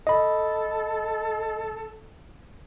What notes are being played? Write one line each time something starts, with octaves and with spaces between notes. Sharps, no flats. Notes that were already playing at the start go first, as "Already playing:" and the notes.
A4 D#5 B5